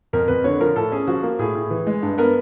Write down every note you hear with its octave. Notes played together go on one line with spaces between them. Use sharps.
F2 A#4
F2 B4
D3 C#5
F3 A#4
A2 A4
C#4 G#4
F3 F#4
A#3
A2 G#4
A2
E3
G#3
G2
B3 A#4